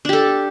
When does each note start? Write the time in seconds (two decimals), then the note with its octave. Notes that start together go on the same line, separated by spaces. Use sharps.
0.05 D4
0.09 G4
0.13 A4